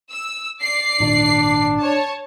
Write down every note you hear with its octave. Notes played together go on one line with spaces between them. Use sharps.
E6
D5 C7
G#1 A#2 D#3 D4
C#5 A5